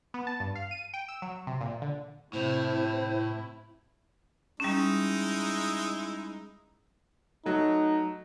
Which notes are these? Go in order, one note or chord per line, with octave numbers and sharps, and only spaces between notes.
B3
A5
G2
F5
D#7
G5
E6
F#3
C3
A#2
D3
A2 C3 E4 C5
G3 G#3 C#4 D#4 E4
F#3 A3 D#4